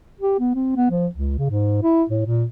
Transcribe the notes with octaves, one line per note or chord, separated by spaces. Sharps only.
G4
B3
C4
B3
F3
C#2
C#3
G#2
E4
A2
A#2